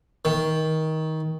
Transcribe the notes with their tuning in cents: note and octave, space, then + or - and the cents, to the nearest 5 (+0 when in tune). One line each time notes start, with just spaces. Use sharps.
D#3 +20